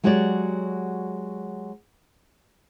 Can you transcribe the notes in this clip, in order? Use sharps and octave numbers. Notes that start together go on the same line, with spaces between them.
F#3 G#3 F#4 G4 C#5 D5